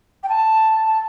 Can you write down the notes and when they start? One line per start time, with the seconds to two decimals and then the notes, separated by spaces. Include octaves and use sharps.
0.23 G5
0.28 A5
0.86 A5